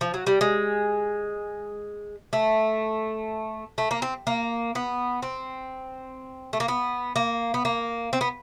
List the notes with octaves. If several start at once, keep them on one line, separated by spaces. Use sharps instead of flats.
F3
F#3
G3
G#3
A3
A3
A#3
C4
A#3
B3
C4
A3
A#3
B3
A#3
B3
A#3
C4
B3